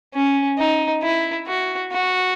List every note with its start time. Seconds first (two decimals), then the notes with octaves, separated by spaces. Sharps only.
0.14 C#4
0.58 D#4
1.03 E4
1.47 F#4
1.92 F#4